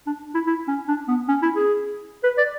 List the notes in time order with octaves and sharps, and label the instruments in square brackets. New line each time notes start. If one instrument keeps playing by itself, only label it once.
[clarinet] D4
E4
E4
C#4
D4
B3
C#4
E4
G#4
B4
D5